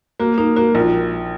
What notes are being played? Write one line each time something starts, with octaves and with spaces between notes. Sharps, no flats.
A#3 F#4
A#3 D#4
A#3 F#4
A#1 F4